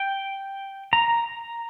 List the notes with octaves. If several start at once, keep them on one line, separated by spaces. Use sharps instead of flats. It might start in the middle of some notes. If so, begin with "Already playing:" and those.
Already playing: G5
A#5